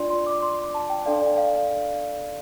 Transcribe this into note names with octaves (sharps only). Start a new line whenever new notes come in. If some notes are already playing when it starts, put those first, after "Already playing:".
Already playing: D4 F4 D5 C6
C6
D6
C6
A5
G5
D4 A4 D5 F5
D5
F5